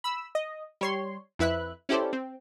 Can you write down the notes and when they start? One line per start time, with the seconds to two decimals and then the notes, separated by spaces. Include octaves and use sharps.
0.04 B5 E6
0.35 D#5
0.81 G3 C#5 C6
1.39 F2 E4 B4 E5 F#6
1.89 C#4 E4 G4 A4 C5 D5
2.13 C4